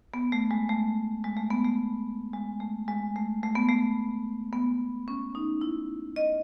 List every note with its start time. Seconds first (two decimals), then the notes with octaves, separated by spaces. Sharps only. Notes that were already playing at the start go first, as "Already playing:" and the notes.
0.14 B3
0.32 A3
0.51 G#3
0.69 A3
1.24 G#3
1.37 A3
1.51 B3
1.65 A3
2.33 G#3
2.60 A3
2.88 G#3
3.16 A3
3.43 A3
3.55 B3
3.69 A3
4.53 B3
5.08 C#4
5.35 D#4
5.61 E4
6.16 D#5